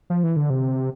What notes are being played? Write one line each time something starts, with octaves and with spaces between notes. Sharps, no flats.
F3
E3
D3
C3